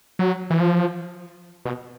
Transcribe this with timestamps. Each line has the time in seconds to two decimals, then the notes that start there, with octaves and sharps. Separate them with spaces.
0.19 F#3
0.50 E3
0.60 F3
1.65 B2